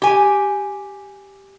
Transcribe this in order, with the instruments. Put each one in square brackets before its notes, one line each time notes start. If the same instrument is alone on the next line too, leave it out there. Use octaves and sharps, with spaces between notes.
[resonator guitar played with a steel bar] G4 G#5